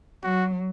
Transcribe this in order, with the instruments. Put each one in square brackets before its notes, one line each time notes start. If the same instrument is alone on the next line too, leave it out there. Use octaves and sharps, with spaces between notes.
[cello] F#3 [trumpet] F#4